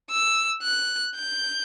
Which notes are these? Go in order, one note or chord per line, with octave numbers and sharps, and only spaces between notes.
E6
F#6
G6